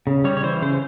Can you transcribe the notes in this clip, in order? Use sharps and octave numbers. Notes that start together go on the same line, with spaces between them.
C#3
G3 C#5
C#5
E3 C5
C#3 C5